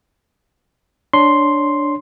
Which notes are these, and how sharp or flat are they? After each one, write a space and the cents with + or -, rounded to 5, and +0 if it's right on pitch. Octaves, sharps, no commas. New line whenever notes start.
D4 +0 C#5 +0 C6 +0